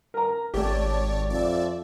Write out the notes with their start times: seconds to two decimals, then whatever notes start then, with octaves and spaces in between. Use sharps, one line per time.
0.14 A#4 A#5
0.54 G#1 A3 G4 C#5 D5 A5
1.30 F2 D5 E5